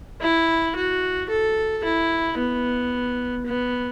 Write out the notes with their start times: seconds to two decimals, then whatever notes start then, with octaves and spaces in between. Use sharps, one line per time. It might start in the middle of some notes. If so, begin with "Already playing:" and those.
0.21 E4
0.76 F#4
1.29 A4
1.84 E4
2.37 B3
3.46 B3